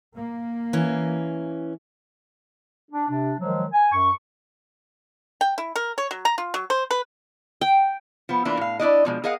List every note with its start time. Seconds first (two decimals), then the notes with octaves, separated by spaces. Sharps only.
0.14 A#3
0.73 E3 C#4
2.91 D4
3.08 C3 D4
3.39 D#3 F3 F#3 G#3
3.71 G#5
3.92 F#2 C#6
5.41 G5
5.58 E4
5.76 A#4
5.98 C#5
6.11 F#3
6.25 A#5
6.38 F4
6.54 F#3
6.70 C5
6.91 B4
7.61 G5
8.29 F3 B3
8.45 E3 A#3 D4 E4 F4
8.57 A2 F5
8.80 D4 E4 D5 D#5
9.05 B2 F3 G#3
9.24 G#4 A#4 D#5 F5 F#5